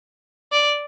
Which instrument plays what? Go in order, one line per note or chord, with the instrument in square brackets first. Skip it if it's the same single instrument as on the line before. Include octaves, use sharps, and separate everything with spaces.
[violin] D5